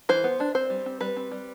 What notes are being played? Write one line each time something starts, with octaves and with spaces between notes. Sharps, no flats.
E3 C5
B3
D4
C4 C5
G3
C4
G3 B4
C4
G3